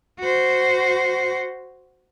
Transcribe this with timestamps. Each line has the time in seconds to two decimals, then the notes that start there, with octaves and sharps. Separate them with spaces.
0.20 F#4 C5